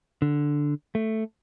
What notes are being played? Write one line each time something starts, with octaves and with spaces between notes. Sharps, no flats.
D3
A3